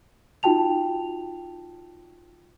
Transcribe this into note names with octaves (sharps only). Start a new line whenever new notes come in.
D#4 F4 F#4 G5 A5 F7